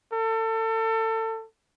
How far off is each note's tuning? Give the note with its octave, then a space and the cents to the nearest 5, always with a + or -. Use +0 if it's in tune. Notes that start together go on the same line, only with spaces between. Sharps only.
A4 +30